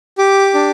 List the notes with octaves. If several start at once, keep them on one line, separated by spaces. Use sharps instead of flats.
G4 D6
D4